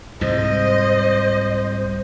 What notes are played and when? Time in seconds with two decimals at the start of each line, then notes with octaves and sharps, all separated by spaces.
0.21 C2 G#2 C5 D#5